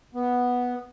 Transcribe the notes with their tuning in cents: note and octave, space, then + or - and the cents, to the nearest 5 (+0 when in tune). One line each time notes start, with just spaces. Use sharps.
B3 -5